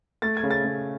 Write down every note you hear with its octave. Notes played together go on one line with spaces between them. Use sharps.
A3 A6
G#6
C#3
A6
C#3